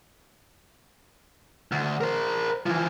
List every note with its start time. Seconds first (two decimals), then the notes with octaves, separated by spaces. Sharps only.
1.72 D2
2.01 A#4 C5
2.66 E3 F3